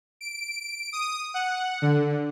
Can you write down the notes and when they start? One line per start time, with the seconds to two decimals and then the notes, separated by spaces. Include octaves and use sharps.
0.21 D7
0.93 D#6
1.34 F#5
1.82 D3